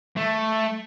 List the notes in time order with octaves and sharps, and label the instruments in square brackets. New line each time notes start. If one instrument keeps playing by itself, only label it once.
[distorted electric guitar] A3